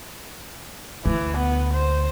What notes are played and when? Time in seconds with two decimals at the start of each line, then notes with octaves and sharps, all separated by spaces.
1.06 D2 E3
1.38 B3
1.74 C5